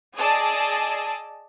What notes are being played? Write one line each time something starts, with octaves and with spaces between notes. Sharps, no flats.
G#4 D5 D#5 A5 E6